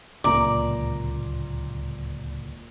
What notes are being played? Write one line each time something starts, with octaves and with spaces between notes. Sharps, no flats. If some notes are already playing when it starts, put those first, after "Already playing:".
D1 C#2 A#2 A#3 D5 A#5 D6